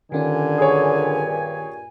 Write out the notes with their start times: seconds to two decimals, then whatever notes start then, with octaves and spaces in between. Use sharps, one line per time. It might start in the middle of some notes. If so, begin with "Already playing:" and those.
0.12 G2 A#2 D3 D#3 C#4 D4 G#5
0.58 G#4 C#5